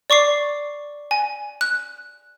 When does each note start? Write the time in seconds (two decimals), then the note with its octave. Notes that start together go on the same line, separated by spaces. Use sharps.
0.10 D5 C#6 D6 C7
1.11 G#5
1.61 F#6